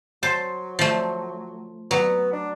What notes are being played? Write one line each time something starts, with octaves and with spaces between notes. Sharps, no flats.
F#3 C5 A5
F3 A3
F#3 B3
D4